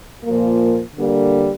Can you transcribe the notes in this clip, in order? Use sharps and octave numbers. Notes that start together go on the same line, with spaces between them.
A#2 F3 A#3
D3 G3 A#3